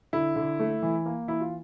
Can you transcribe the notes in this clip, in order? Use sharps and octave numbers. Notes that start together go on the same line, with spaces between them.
D3 E4
D3
A3
E3
A#3
E3 E4
F4